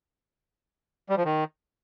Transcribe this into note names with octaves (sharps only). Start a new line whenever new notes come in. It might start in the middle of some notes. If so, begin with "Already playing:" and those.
G3
F3
D#3